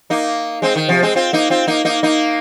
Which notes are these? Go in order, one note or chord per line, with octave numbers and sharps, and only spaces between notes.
A#3 D#4
G#3 C4
D#3
C3 F3
G#3 C4
C4 F4
A#3 D#4
C4 F4
A#3 D#4
A#3 D#4
A#3 D#4